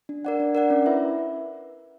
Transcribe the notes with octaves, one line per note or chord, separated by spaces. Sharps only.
D4
A#4 D5 F#5
D4
A#4 D5 F#5
C#4
E4 B4 E5